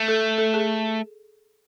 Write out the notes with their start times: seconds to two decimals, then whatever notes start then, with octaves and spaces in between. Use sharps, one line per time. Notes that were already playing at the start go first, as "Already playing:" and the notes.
Already playing: A3
0.08 A4
0.38 A4
0.54 G#4